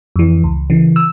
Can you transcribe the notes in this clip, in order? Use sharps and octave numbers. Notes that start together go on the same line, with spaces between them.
F2 E3
C#2
C#3 E3
E6